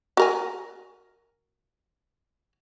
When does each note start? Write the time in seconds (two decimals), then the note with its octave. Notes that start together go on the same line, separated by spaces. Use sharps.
0.17 F#4 A#4 G#5